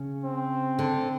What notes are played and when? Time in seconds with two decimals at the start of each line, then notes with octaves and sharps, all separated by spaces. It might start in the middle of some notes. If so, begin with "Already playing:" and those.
Already playing: C#3
0.24 C4
0.79 D3